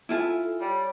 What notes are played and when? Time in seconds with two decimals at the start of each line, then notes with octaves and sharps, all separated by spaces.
0.09 E4 F4 A4 G#5
0.61 G3 C#5